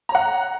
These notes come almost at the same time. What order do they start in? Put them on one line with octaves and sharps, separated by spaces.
A#5 C#5 F#5